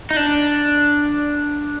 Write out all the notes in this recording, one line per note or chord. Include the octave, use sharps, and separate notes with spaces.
D#4
D4